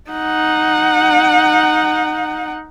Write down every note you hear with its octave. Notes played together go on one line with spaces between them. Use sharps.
D#4 F#5